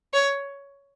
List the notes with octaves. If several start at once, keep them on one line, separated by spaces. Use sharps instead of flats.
C#5